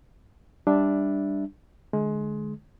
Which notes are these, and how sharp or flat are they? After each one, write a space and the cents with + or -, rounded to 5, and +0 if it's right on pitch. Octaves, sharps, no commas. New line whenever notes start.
G3 +10 D4 +0 E5 +0
D3 +25 G#3 +25